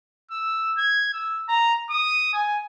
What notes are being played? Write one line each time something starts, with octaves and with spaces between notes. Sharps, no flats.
E6
G#6
E6
A#5
D#6
G#5